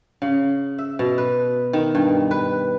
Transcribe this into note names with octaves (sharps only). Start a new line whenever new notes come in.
C#3
E5
B2
B4
D#3
G2
B4